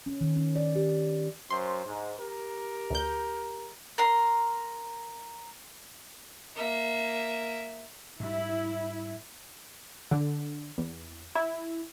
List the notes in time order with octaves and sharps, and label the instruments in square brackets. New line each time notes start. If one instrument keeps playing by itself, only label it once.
[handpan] C#4
D#3
C#4
D5
G4
[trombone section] F#2 C5 [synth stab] C6
[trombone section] G#2
G4 A#4
[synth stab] D2 G6
[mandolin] A#4 C6
[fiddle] A#3 E5
[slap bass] G#2 G3 [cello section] E4
[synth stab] D3
E2
E4